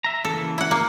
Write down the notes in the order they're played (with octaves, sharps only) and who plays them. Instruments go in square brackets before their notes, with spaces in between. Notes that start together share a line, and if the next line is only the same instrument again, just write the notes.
[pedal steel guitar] E5 A#5
[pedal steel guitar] C#3 E3 A#3 [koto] A4
[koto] E4 F#5
A#3